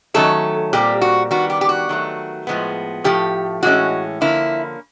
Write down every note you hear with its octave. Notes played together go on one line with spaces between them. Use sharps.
D#3 F#3 A3 C#4 A4
A#2 G3 C4 G4
F#4
D#3 G3 B3 F#4
G4
G4
F#4
D#3 F#3 A3
A2 F3 G#3 B3
A2 F3 A3 G4
A2 E3 G#3 C#4 F#4
D3 F3 A#3 C#4 E4